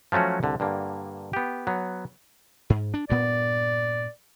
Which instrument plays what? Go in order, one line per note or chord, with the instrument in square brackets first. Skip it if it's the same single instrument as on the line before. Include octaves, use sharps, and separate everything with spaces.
[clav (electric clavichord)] F3 F#3 A3 C#4 F#4
C2 D3
G2 D3 A#3
B3 G4
F#3 B3
[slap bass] G#2
D4
[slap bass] G2 A#2 B3 [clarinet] D5